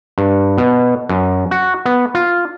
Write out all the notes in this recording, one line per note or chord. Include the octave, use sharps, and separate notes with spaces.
G2
B2
F#2
F#4
B3
F4